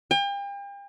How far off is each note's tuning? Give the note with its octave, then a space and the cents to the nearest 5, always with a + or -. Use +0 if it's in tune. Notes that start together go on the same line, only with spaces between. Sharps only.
G5 +40